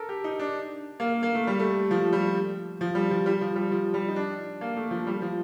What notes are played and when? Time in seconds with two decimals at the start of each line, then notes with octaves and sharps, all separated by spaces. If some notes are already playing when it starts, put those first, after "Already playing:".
Already playing: A4 A#4
0.09 G4
0.24 D#4
0.39 D4
1.00 A#3
1.23 A#3
1.35 A3
1.47 G3
1.59 A3
1.91 F3
2.13 G3
2.81 F3
2.95 G3
3.11 F3
3.26 G3
3.41 F3
3.56 G3
3.71 F3
3.94 G3
4.08 D#4
4.16 D4
4.61 A#3
4.77 A3
4.91 F3
5.07 G3
5.22 F3